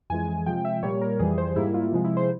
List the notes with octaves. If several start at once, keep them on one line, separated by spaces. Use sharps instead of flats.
F2 E3 G#3 G#5
G#5
C3 F3 G#3 G5
E5
A#2 G3 A#3 C#5
A#4
F2 E3 G3 G#4
C5
G#2 G3 A#3 E4
F4
C3 F3 G#3
E4
C5